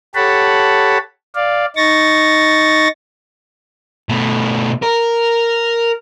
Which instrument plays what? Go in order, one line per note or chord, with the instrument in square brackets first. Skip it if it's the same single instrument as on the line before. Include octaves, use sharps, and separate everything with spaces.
[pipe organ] G4 A4 C#5 F#5 A5 B5
D5 F5
D#4 C#6 A6 A#6
[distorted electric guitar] B2 A3
A#4